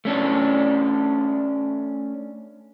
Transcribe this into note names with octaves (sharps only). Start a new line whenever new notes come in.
A3 C#4 D4